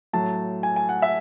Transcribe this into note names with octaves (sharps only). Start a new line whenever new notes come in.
A2 F#3 A5
G#5
G#5
F#5
E5